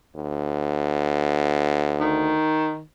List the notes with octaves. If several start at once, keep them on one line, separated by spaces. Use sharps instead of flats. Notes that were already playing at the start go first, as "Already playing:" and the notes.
D2
D#3